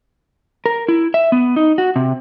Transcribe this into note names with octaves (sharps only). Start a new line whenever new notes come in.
A#4
E4
E5
B3
D#4
F#4
C3